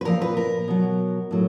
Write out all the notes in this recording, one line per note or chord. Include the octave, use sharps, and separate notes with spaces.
B4
A#2 F3 A#4
B4
A#4
B2 F#3
A2 F#3